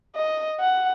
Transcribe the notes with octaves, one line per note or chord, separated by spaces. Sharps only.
D#5
F#5